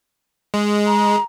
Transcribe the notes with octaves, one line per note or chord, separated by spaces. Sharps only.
G#3
A#5